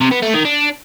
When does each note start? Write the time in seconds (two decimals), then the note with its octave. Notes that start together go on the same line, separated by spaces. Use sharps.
0.01 C3
0.12 B3
0.23 A3
0.34 D#3
0.45 D4